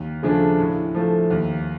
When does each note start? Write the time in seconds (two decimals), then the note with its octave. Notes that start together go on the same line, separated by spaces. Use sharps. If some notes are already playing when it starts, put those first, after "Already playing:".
Already playing: D#2
0.23 C#3 F3 A3 D4
0.59 A2
0.94 F3 A3
1.30 D#2